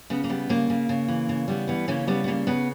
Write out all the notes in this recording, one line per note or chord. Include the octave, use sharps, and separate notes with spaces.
C#3 B3
A#3
G3 B3
C#3 A#3
C#3
C#3
E3
C#3
G3 B3
E3 B3
C#3 A#3 C#4
G3 B3
B3
C#3 A#3
C#3 B3